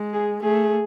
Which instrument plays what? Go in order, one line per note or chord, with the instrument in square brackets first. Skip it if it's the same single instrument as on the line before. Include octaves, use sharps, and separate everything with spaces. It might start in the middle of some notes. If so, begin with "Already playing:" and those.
Already playing: [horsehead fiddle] G#3
[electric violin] G#4
[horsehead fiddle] A3 [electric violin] G#4